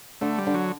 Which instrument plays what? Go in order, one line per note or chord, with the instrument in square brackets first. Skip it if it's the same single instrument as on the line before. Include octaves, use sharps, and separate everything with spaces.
[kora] D3 [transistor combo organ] A3
[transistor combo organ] G3
[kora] D3
[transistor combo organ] F#3